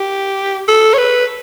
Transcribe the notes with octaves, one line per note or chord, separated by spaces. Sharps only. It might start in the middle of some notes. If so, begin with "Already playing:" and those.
Already playing: G4
A4
C#5
B4